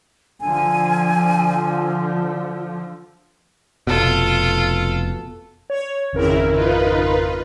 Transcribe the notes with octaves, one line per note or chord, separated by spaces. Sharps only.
D3 F3 G#5
F1 B2 F4 A4
C#5
G#1 F2 C#3 E4 A#4
D#4 F4 B4